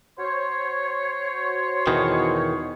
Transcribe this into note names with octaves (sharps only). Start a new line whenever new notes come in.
F#4 C5 C#5
E2 B2 D#3